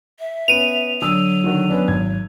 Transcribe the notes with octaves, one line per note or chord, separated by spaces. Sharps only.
E5
B3 C#4 D#7 F7
D3 F#3 D#6 E6
D3 D#3 F#4
B3 C#4 D4
G#1 G#6